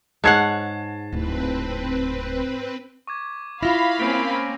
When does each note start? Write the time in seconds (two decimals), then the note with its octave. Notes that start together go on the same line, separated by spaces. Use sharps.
0.24 G#2 C#5 F#5 A5 G#6 C7
1.12 D1 C4 E4 B4
3.07 C#6 D6 G#6
3.63 E4 F4 F5 B5 F6 A#6 F7
4.00 A#3 C4 C#4 D7